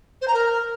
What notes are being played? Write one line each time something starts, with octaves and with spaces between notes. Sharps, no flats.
C5
A#5
A#4